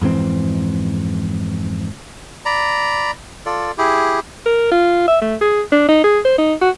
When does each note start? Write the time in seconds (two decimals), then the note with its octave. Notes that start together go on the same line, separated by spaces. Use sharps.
0.01 F2 G#2 E3 C4
2.46 D5 A#5 B5
3.46 F4 A4 D5
3.78 E4 G4 G#4
4.46 A#4
4.71 F4
5.08 E5
5.21 A3
5.41 G#4
5.72 D4
5.88 D#4
6.04 G#4
6.25 C5
6.38 D#4
6.61 F#4